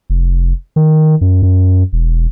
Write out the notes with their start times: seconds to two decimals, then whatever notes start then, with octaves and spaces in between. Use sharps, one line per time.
0.10 F1
0.76 D#3
1.21 F#2
1.43 F#2
1.93 E1